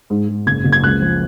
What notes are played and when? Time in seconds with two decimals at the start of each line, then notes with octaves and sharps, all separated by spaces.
0.10 G#2
0.28 G#2
0.47 F#1 G#6
0.64 F#1
0.72 G#6
0.83 C#2 F#6
1.01 F3